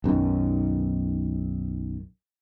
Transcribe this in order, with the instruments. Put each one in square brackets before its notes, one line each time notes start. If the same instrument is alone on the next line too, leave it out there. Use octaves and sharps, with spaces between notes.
[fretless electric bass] B1 F#2 D#3